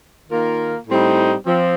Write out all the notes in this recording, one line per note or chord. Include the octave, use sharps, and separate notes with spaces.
D#3 A#3 F4 A#4
A2 G3 C4 D#4
F3 C4